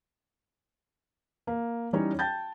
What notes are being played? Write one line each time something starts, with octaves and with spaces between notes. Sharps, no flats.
A#3
E3 G3 C#4 D#4 C#5
G5 A5 G6 A6